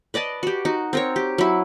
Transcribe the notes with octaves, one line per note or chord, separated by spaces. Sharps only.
B4 D5 D#5 A5
F#4 G4
D#4 F#4
C4 A#4 C#5
G4
F#3 E4